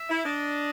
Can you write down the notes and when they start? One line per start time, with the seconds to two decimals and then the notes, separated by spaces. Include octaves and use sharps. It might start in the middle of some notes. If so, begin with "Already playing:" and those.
Already playing: E5
0.09 E4
0.25 D4 D#5